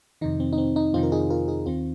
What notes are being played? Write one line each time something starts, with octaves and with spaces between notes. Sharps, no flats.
F2 C3 D#3 D#4
C4
D#4
C4
D#4
F2 C3 D#3 C4 F4
A#4
D#4 G#4
F4 A#4
D#4 G#4
D#2 D#3 C4 F4